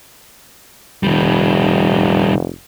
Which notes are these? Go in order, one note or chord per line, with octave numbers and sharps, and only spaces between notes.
F1 D#3 G3